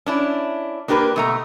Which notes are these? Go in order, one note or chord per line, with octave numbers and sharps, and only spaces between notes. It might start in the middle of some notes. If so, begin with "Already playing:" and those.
C#4 D4 E4
A#3 D4 G4 A#4 B4
B2 A3 A#5